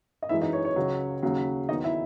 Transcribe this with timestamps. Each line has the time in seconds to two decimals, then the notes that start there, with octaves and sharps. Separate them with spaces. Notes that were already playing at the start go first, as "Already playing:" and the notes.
0.22 D#5
0.29 F#2 E3 G#3 E4 E5
0.42 D#4 D#5
0.53 C#5
0.65 C#5
0.76 C#2 C#3 F#3
1.23 D#2 C#3 F#3
1.69 E2 D#3 F#3 D#4 D#5
1.84 E4 E5